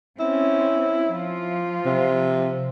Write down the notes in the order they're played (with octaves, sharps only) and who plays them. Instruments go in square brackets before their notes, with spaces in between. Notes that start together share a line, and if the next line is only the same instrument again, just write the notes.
[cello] C4 C#4 [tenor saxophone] E4
[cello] F3 F4
[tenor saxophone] C3